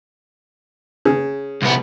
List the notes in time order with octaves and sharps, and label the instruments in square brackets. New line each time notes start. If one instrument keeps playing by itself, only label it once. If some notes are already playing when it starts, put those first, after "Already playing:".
[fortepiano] C#3
[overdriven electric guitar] C2 B3